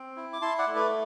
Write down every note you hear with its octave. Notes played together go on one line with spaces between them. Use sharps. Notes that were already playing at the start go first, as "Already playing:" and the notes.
Already playing: C4
E4
D6
E4 A5 C6
D5 F#5
A3
B4 D5